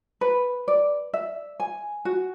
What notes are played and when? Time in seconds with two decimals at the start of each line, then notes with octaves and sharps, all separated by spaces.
0.21 B4
0.68 D5
1.14 E5
1.60 G#5
2.05 F#4